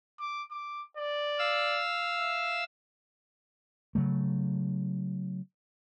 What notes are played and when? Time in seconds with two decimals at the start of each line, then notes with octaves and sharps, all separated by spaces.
0.20 D6
0.51 D6
0.97 D5
1.39 F5 E6
2.20 E5
3.95 C#3 F#3 A3